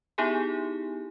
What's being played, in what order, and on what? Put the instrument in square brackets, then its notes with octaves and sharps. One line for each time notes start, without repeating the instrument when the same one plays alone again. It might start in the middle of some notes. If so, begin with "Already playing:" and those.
[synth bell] B3 D#4 E4 G4 G#4 G#5